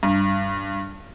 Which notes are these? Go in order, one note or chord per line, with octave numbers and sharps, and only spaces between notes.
G2